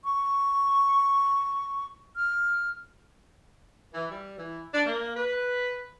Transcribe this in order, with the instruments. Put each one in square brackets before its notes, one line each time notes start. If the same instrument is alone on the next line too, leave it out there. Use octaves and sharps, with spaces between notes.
[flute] C#6
F6
[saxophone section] E3
G3
E3
D4
A#3
B4